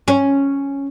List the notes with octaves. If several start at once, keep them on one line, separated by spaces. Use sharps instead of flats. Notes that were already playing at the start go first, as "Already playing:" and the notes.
C#4